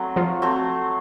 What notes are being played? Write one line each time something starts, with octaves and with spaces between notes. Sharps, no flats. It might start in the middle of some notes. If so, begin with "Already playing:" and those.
Already playing: F#3 A3 C4
F3 F4
F#3 A3 C4